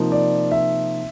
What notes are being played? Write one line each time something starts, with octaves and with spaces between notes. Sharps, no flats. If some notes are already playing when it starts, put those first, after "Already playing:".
Already playing: C3 F3 A#3 D#4
D5
E5